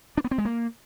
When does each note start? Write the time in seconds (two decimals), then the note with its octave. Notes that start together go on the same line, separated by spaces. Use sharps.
0.18 D4
0.24 B3
0.31 C4
0.38 G#3
0.45 A#3